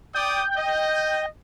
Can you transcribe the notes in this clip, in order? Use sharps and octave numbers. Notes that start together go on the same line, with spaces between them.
D5 G5 D6 D#6 G6
D#5